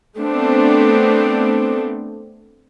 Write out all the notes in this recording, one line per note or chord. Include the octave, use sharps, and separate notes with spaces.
A3 B3 C4 D4